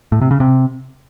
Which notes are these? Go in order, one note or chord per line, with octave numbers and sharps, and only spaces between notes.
A2
C3
C#3
C3